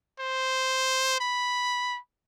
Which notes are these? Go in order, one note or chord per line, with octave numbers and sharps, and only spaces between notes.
C5
B5